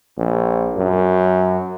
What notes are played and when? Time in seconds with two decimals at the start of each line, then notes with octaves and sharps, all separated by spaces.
0.18 A#1
0.77 F#2